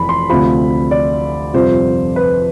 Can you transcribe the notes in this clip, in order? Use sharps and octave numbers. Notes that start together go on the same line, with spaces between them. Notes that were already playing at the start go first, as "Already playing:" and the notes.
Already playing: F1 F2 E3 B5
C6
D2 C3 F3 B5
D5
G1 F2 C3 F3 C5
B4